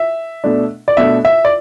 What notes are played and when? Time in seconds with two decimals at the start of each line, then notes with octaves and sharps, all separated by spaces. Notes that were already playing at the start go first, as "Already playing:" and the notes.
Already playing: E5
0.44 B2 A3 D4
0.88 D5
0.97 B2 A3 D4 E5
1.25 E5
1.45 D5